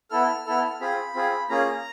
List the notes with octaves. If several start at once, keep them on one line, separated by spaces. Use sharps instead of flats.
B3 E4 A4 F6
B3 E4 A4
C4 F4 G#4 B5
C4 F4 G#4
A#3 C#4 F4 G#4 A#5